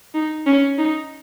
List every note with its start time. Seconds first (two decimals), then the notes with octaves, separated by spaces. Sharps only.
0.15 D#4
0.47 C#4
0.78 D#4